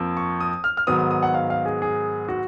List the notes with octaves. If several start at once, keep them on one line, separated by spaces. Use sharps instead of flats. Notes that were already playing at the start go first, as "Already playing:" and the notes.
Already playing: F2 F3 A#3
C#6
D#6
F6
F6
G#2 D#3 F#3 B3 D#6
D#6
D#6
F#5
F5
F5
G#4
G#4
F#4